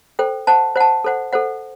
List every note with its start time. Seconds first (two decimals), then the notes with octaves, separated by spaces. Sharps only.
0.19 A4 C5 G5
0.47 C5 F#5 A5
0.76 C5 F#5 A5
1.04 A4 C5 F#5
1.33 A4 C5 F#5